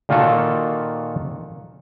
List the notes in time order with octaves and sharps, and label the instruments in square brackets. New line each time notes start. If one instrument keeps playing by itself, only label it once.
[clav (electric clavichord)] A#2 D#3 A#3 F4 F#4 A4